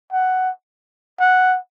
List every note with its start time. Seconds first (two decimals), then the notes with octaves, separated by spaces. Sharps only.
0.12 F#5
1.20 F#5